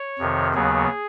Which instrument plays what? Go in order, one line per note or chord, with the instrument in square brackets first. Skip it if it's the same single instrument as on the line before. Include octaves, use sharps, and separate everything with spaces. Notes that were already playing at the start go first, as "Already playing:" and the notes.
Already playing: [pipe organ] C#5
F2 C3 D#3
D#2 C#3 F#3 B3 G#4